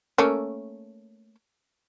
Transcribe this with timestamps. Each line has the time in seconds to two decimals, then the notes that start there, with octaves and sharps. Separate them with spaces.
0.18 A3 A#3 C#4